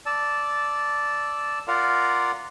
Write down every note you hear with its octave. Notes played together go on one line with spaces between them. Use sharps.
D5 A5 E6
F4 A#4 D5 F5 F#5 A#5